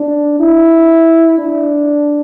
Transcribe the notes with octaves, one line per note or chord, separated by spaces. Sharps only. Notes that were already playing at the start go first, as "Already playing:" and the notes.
Already playing: D4
E4
D4